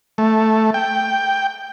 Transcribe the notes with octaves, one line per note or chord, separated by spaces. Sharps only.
A3
G5